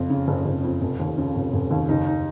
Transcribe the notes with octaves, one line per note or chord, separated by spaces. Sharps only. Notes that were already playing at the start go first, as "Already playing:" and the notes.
Already playing: F#1 F2 F4
C#3
F#1
F#1
F2
F1
D#2
C#3
F1
F1
D#2
F#1 D#4
D#4